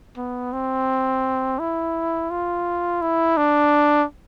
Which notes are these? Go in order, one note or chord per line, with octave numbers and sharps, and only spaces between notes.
B3
C4
E4
F4
E4
D4